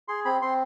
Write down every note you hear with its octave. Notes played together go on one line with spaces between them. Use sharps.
G#4 C6
C4 B5
C4 C6